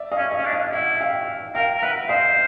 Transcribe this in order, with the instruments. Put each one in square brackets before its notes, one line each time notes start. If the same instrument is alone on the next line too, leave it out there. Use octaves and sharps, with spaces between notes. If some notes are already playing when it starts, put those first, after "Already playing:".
Already playing: [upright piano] D5 E5
D#5 F5
[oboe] C#4
[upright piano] D#5 F5
[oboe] C#4
D4
[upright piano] D#5 F5
[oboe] E4 [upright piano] E5 F#5
[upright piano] F5 G5
[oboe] A#4 [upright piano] F5 G5
[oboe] A#4
[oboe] B4 [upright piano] E5 F#5
[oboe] C5 [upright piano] D#5 F5